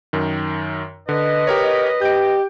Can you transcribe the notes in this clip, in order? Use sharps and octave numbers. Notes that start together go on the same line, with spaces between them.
F#2 D#3
D3 B4 D#5
G4 A#4 C#5
G4 G6 D7